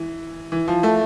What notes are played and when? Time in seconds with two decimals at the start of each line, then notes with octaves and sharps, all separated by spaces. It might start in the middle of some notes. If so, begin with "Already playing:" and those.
Already playing: E3
0.52 E3
0.68 F3
0.83 A3